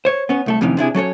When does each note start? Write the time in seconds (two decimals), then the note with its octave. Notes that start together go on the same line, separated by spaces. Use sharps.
0.05 C5 C#5
0.29 B3 C#4
0.46 C2 A3 A4
0.61 F2 A2 C3 D#3 E3 C#4
0.77 C3 D4 E4 G#4
0.94 F#3 C#4 A4 C#5